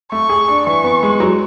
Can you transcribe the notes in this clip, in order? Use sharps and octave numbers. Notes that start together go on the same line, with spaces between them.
A3 C#6
G#4
D4
E3 C#6
B3
G#3
F#3